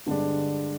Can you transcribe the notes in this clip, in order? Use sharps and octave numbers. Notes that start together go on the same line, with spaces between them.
G2 D3 G#3 D4